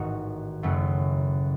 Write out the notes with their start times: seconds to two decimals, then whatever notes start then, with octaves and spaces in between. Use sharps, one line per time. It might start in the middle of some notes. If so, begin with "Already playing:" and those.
Already playing: A1 G#2 D#3 D#4 F#4
0.63 F#1 F#2 C#3 F#3 A3